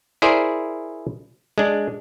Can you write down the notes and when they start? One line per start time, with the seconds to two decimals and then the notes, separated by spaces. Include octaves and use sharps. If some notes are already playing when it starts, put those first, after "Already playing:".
0.22 E4 G#4 A#4 C5 D5
1.58 G#3 D4